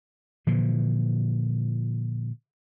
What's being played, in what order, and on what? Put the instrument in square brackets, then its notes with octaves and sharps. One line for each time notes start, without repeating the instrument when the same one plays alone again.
[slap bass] A#2 D3 E3 F3